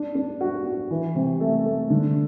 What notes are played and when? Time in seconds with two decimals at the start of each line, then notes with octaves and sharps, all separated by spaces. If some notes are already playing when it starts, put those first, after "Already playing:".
Already playing: D4
0.15 D4
0.41 F#4
0.65 F#4
0.90 E3
1.15 C3
1.40 A3
1.65 A3
1.90 D3